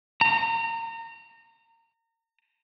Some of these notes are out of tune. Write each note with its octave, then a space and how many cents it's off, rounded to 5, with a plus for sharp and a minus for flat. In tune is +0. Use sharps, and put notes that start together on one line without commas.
A#5 -30